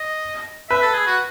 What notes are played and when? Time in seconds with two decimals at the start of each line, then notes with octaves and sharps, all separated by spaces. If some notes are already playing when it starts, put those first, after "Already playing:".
Already playing: D#5
0.70 B4 E5
0.82 A4
0.94 G#4
1.07 F#4